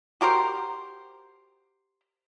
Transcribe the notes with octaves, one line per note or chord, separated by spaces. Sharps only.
F#4 G4 A#4 C5